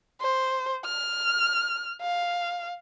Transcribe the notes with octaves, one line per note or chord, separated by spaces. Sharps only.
C5
F6
F5